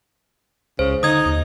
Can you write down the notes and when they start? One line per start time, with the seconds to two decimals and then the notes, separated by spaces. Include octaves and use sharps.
0.79 C#2 C#3 C5
1.03 D3 D#4 D#6 G#6
1.26 D#2